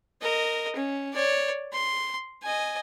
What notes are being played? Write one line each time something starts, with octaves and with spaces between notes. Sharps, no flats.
A#4 D#5
C#4
C#5 D5
C6
D#5 G#5